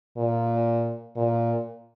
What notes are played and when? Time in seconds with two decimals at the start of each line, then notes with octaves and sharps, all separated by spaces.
0.17 A#2
1.16 A#2